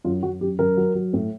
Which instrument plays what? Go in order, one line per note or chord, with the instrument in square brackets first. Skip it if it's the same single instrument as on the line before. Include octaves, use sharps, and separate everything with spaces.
[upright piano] F#2 F4
F#2 F#4
F#2 G4
F#2 A#4
F#3
F#3
A2